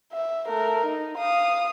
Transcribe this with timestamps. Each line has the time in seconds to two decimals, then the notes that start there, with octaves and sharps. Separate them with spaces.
0.13 E5
0.48 A3 A#4
0.86 D#4
1.18 F5 D#6